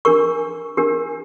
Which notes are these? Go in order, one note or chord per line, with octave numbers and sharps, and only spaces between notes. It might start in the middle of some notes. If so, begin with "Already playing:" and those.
D4 G4 A#4 C#6
D4 G4 A#4